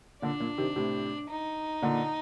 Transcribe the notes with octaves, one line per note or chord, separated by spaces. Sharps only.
A#2 D3 D4
A#2
C3 D#3
A2 C3
D#4
A#2 D3